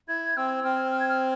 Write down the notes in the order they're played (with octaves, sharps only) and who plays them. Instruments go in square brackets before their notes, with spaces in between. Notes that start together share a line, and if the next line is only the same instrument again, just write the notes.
[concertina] E4 [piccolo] G#6
[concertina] C4 [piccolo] E6
[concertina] C4 [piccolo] F6
[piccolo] F6
G#6
F6